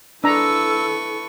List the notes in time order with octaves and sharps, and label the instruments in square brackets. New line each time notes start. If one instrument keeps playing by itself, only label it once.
[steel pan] D4 A#5 [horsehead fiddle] E4 A4 [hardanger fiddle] B4 C#6 [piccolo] E6